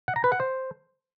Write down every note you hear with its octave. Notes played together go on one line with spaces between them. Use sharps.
F#5
A#5
B4
F#5
C5